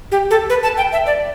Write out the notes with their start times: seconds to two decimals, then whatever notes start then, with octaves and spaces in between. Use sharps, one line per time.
0.12 G4
0.31 A4
0.50 B4
0.63 A5
0.77 G5
0.92 E5
1.07 D5